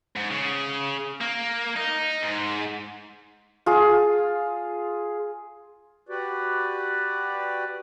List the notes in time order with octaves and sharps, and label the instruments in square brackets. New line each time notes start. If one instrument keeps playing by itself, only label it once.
[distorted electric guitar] G#2
C#3
A#3
D#4
G#2
[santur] F4 G#4
[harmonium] F#4 G4 B4 D5